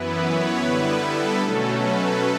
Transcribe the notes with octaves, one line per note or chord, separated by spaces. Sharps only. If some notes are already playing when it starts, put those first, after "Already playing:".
Already playing: F#2 E3 B3 E4 B4
C#5
D3 G3 B3 E4 B4
A4
B2 F#3 A3 C#4 A4
B4